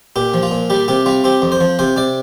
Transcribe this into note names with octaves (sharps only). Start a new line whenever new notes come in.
A#2 G4
F3
F4
A#2
G3 G4
C3 G4
G3 F4
C4 G4
F2
C5
F3
C3 C5
C3 D5